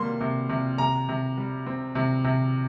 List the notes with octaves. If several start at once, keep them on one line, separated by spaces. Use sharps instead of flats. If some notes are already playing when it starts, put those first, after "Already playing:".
Already playing: C3 G3 A#3 C6
C3
C3
C3 A#5
C3
G3
C4
C3
C3